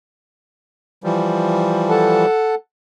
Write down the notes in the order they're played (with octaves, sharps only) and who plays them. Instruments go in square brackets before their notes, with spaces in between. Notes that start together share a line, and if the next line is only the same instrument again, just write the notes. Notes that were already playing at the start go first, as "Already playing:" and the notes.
[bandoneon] E3 F3 G3
[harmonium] A4 F#5 A5